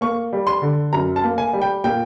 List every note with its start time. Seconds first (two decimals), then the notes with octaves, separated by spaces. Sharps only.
0.01 A#3 C#6
0.33 G3
0.47 C6
0.62 D3
0.93 F#2 A#5
1.16 A5
1.23 A#3
1.38 G#5
1.53 G3
1.62 G5
1.84 A#2 G5